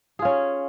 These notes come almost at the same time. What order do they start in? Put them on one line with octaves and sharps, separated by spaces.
G#4 F4 C#4